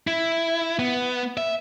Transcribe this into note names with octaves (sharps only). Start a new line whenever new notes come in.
E4
B3
E5